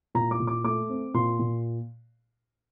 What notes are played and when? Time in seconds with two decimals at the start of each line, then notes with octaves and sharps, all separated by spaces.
0.15 A#2 A#5
0.31 D6
0.40 A#2
0.47 D6
0.64 A3 D6
0.89 C4
1.14 A#2 C6
1.39 A#2